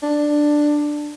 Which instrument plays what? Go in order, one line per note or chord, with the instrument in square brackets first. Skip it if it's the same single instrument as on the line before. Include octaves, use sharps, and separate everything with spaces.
[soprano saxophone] D4